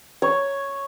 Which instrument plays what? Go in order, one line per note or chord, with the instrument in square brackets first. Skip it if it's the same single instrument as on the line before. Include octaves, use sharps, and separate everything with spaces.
[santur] C#5